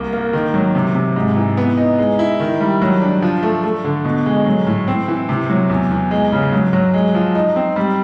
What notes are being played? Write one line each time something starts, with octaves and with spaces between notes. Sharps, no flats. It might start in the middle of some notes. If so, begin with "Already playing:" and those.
Already playing: C2 A#3
A#3
D#3
F#3
C3
C3
G#2
E3
B3
D#4
G#3
E4
D#3
G3
F#3
D4
F3
A3
A3
D3
B2
G#3
F#3
A2
C4
E3
C3
F#3
E2
E2
G#3
C#3
F#3
F#3
G#3
F3
D#4
C4
G3